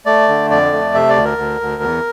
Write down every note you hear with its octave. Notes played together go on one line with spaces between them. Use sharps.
A3 D5
D3
F2 D5
A3
C3 E5
D5
D2
A#4
D2
D2
E2